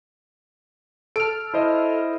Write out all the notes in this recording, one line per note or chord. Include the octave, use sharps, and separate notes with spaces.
A4 F6 D7
E4 C5 D#5